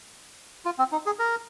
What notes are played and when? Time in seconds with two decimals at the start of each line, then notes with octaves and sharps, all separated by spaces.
0.65 F4
0.79 C4
0.92 D#4
1.06 G#4
1.19 A#4